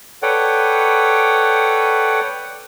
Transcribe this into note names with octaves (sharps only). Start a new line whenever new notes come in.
A4 B4 C#5 D5 F#5 G5